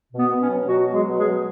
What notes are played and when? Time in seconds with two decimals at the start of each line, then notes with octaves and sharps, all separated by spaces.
0.11 B2
0.18 B3
0.30 B2
0.43 C#4
0.49 F#3
0.68 B2 F#3 F#4
0.87 F#3
0.93 G#3 G#4
1.06 B2
1.18 G#3 G#4
1.24 F#3